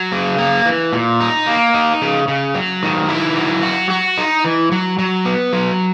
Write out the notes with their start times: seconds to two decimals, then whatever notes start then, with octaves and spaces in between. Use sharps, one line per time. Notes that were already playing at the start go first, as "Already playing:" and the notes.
Already playing: F#3
0.12 C#3
0.38 A#3
0.65 E3
0.93 A#2
1.20 D#4
1.46 A#3
1.74 D#4
2.02 C#3
2.28 C#3
2.55 F#3
2.83 D#3
3.09 E4
3.37 F#3
3.63 F#4
3.90 F#4
4.17 D#4
4.44 E3
4.72 F#3
4.99 F#3
5.25 B3
5.53 F#3